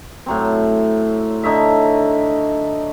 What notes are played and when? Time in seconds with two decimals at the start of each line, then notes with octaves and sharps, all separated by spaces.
0.26 A2 F#3 C4
1.43 D3 D#4 C#5 E5